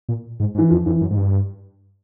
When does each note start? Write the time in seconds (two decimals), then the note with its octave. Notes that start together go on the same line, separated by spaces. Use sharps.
0.09 A#2
0.40 G#2
0.55 G#2
0.58 E3
0.70 F2 F3
0.86 F2 E3
1.01 F#2
1.11 G#2
1.17 G2